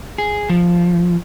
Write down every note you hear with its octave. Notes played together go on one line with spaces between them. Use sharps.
G#4
F3